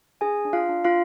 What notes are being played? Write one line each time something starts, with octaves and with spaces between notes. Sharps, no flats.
D4 G#4 G#5
D4
F4 F5
D4
F4 F5